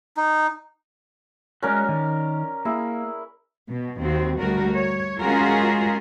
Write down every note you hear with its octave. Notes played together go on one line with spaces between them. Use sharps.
D#4
G#3 C#4 F#4 A#4 D5
D#3
A#3 E4 G#4
B2
D#2 C4 F#4
D2 G3 F#4 A#4
C#5
G#3 C#4 F4 F#4 G#4 A#4